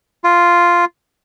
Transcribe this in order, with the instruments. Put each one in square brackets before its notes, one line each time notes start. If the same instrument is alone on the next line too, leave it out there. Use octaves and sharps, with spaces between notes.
[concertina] F4